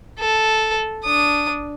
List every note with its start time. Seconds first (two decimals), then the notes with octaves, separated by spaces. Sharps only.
0.19 A4
1.05 D4 D#6